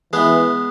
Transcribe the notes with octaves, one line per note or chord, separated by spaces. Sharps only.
E3 G#3 B3